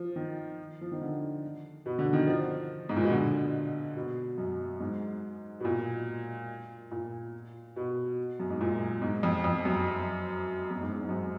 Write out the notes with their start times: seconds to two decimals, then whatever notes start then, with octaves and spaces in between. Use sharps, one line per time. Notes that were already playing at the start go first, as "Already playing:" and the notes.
Already playing: F3
0.16 D#3
0.81 F3
0.92 D#3
1.01 D3
1.86 B2
1.99 D3
2.13 D#3
2.27 F3
2.89 G#2
2.96 A#2
3.04 B2
3.11 D3
3.96 B2
4.38 F#2
4.80 G#2
5.60 B2
5.65 A#2
6.91 A#2
7.76 B2
8.40 F#2
8.50 G#2
8.61 A#2
9.02 G#2
9.23 F2
9.44 F2
9.65 F#2
10.71 F#2
10.81 G#2
10.92 G#2
11.03 G#2
11.09 F#2